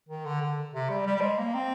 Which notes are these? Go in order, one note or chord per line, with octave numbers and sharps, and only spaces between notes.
D#3
D3
D3
C3
G3
G3
G3
G#3
A#3
C4